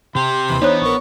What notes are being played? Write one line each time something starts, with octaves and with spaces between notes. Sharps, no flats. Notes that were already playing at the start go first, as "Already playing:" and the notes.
C3 G4 C6
D#2 E3 B5
E3 B3 D4 D#4 C5 C#5
A#1 A#4 C#6